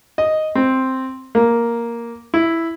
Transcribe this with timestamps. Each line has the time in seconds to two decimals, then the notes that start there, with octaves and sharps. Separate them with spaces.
0.18 D#5
0.55 C4
1.35 A#3
2.34 E4